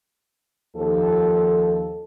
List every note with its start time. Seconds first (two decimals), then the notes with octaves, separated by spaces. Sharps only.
0.76 D#2 F3 A4